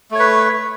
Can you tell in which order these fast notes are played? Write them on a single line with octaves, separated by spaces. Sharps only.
A3 C#5 B4